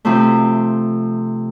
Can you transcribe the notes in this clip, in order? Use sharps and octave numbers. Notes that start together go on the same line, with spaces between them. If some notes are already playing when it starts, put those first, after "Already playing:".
C3 F3 A3